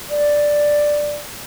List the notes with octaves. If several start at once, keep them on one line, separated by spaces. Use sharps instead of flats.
D5